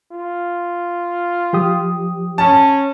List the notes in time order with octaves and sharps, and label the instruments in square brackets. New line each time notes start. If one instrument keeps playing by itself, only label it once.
[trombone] F4
[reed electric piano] F3 G4 D#6
[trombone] C#4 [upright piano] A5